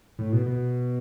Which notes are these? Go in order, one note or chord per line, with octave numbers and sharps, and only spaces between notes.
A2
B2
B2